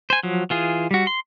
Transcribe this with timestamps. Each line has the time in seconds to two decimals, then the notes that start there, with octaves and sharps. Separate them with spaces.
0.10 C5 G#5
0.23 F3 F#3
0.50 E3 F4 G#4
0.91 G3 F#4
1.07 C6